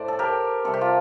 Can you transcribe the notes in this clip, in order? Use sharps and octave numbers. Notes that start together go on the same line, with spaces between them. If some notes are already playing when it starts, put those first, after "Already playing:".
Already playing: A2 C5 D5
A4
G4 A#4
C3 G3 C4 A4
G4
F4